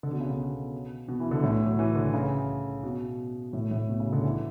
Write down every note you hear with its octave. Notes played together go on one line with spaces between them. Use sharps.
D3
B2
C#3
B2
B2
E3
D3
A2
F#3
E3
D3
C#3
B2
A2
A2
B2
C#3
D3
E3